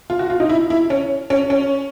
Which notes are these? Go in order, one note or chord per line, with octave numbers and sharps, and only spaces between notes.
F4
F#4
F4
D#4
E4
E4
C#4
C#4
C#4